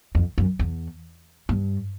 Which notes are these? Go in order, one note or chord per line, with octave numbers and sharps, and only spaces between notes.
F2
F#2
E2
G2